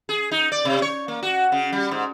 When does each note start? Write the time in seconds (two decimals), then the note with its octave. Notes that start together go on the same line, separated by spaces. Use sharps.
0.09 G#4
0.31 D#4
0.52 D5
0.65 C3
0.82 C#5
1.08 A#3
1.23 F#4
1.52 C#3
1.73 G3
1.91 G#2